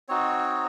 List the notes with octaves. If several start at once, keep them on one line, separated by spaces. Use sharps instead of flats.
C4 D#4 F#4 C#5